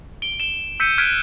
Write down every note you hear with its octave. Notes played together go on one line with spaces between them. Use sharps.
D7 G7
E7 G7
E6 G6 B6 C#7 D#7
F6 F#6 G#6 B6 D7 D#7